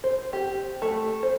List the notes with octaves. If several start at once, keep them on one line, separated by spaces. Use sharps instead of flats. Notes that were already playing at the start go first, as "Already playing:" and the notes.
C5
G4
A3
C5